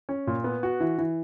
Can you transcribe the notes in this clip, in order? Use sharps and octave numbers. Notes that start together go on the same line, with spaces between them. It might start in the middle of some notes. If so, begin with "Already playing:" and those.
C#4
A#2
B3
F#4
E3
E3